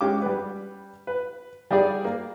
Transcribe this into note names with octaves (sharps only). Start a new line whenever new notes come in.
G#3 C#4 G4 D6
G3 B4
B4
G3 G4 G#4 D5
A#3